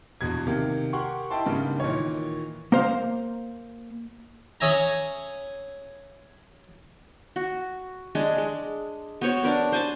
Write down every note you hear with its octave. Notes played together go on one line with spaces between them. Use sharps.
A#1 E2 B2 G#6
C3 D#3 A#3
G4 A#4 F#5 C6 C#6
E4 D#5 G5 A5 C6
G#2 C#3 G3 A#3 B3 D4
A#2 D#3 E3 C#5
A#3 C5 F5
C#4 G#4 C#5 E5 G#5 A#5
F#4
G#3 D4 G#4
G#3
B3 F#4 C5 C#5
D4 A#4 B4
C5 G#5 A5